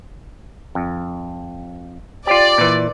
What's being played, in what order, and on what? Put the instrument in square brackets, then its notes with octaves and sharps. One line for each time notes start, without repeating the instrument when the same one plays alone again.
[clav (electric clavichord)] F2
[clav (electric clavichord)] F4 G4 [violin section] D5
[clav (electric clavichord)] A#2 E3